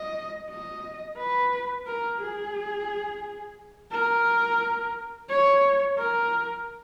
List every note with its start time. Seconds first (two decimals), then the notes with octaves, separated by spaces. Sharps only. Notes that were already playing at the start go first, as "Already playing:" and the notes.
Already playing: D#5
0.50 D#5
1.18 B4
1.87 A#4
2.21 G#4
3.91 A#4
5.29 C#5
5.98 A#4